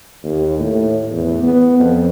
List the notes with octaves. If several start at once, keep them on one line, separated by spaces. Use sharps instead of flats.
D#2
A2
E2
B3
F2